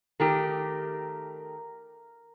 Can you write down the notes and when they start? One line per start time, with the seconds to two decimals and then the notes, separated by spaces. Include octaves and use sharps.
0.20 D#3 A3 G4 A#4